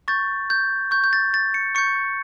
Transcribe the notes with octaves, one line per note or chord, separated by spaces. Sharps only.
C#6 G6 A6
G6
C#6 G6
G6
A6
A6
C#7
C#6 G6 C#7